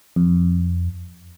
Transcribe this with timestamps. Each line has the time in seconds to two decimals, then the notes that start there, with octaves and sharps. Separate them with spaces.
0.16 F2